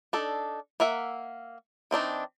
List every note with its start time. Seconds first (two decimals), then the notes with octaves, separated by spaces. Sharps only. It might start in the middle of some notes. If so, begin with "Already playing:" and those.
0.13 D4 D#4 A4
0.80 A#3 A#4 E5 F#5
1.91 E3 C4 D4 D#4